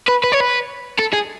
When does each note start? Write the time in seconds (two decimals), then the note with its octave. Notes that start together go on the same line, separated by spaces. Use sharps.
0.08 B4
0.24 B4
0.32 C#5
0.40 B4
0.99 A4
1.13 G#4